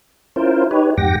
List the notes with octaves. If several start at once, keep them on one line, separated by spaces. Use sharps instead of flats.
C#4 E4 F4 A#4 C5
D#4 G4 B4 C#5
F2 G#2 G4 F#5 G5 A#6